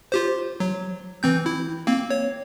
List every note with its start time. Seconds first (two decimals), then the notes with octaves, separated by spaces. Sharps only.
0.12 F4 G4 C5
0.60 F#3
1.23 E3 C4 G6
1.46 E4
1.87 A#3 C4
2.10 C#5